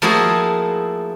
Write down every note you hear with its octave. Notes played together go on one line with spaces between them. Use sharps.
F3 A3 A#3 E4 F#4 G#4